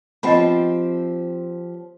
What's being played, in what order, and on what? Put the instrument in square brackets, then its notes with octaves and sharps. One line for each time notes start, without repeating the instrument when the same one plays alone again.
[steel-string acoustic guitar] F3 C4 G4 [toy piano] D#5 F#5 B5